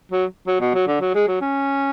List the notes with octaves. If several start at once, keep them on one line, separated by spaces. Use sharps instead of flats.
F#3
F#3
B2
F#3
D3
F#3
G#3
F#3
C#4